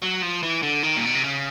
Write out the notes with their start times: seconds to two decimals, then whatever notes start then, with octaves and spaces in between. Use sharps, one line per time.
0.02 F#3
0.22 F3
0.43 E3
0.63 D3
0.83 D#3
0.96 A#2
1.06 B2
1.15 C3
1.24 C#3